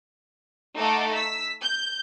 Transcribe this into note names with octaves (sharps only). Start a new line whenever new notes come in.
A3 D#4 A4 F5 F#5 D6
E6 B6
G6